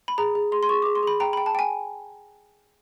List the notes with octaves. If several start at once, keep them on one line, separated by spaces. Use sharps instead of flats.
B5
G#4 A#5
G#4
G#4 C6
C6
G#4 C#6
D6
G#4
C6
G#4 B5
G5 A#5
B5
G5
A5
G5 G#5